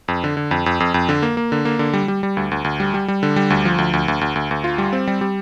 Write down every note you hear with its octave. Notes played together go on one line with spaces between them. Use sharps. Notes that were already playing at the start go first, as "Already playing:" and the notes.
F2
D3
D3
F2
F2
F2
F2
D3
A#3
A#3
D3
A#3
D3
G3
G3
G3
D2
D2
D2
G3
G3
G3
D3
G3
D2
F3
D2
D2
D2
D2
D2
D2
F4
G3
C4
G3
G3